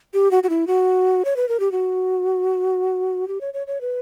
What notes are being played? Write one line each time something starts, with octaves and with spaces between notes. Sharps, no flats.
G4
F#4
F#4
E4
F#4
C#5
B4
A#4
G4
F#4
G4
C#5
C#5
C#5
B4